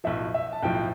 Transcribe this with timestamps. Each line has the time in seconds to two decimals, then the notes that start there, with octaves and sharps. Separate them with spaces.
0.04 B1 A2 F3 E5
0.34 E5
0.53 A5
0.63 B1 A2 F3 G5